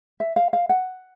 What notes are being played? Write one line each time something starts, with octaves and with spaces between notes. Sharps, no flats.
E5
F5
F5
F#5